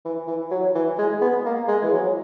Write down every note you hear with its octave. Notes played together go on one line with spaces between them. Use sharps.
E3
E3
F#3
E3
G#3
B3
A#3
G#3
E3
F#3